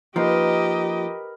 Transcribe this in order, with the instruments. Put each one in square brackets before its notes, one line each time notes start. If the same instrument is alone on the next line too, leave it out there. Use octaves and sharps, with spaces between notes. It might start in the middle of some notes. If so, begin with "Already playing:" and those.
[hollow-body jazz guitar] F3 A#3 D#4 [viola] G4 D#5 [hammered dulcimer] A#4 B4